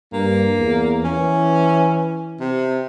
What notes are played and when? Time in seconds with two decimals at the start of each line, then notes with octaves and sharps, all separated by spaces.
0.13 G2 A#3
0.58 E2
1.04 E3 C#4
2.40 C3